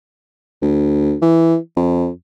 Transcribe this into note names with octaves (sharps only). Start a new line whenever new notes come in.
D2
E3
F2